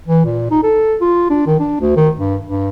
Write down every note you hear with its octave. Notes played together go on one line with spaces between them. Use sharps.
E3
A#2
D#4
A4
F4
D4
D#3
D4
D2
D#3
G2
G2